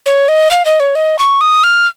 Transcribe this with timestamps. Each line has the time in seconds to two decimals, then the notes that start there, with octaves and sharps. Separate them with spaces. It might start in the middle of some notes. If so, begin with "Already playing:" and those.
0.06 C#5
0.28 D#5
0.51 F5
0.65 D#5
0.80 C#5
0.95 D#5
1.19 C#6
1.41 D#6
1.64 F6